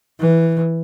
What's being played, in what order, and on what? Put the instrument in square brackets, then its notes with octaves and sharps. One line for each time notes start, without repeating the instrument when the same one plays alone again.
[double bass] E3